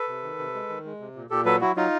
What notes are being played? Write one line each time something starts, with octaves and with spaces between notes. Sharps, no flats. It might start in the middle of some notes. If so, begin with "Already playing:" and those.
Already playing: A4 B4
C3
D#3
C3
G#3
D#3
G#3
C3
A#2
A#2 G4 A4
F#3 A4 B4
F#3 E4 F#4
F#3 D#4 F4